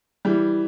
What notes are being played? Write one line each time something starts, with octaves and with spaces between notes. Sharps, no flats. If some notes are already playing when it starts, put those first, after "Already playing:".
E3 G3